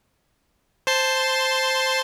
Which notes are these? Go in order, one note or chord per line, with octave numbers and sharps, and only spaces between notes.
C5 A5 C6